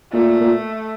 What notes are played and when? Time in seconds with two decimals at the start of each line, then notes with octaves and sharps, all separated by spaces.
0.13 A#2 A3
0.41 A#2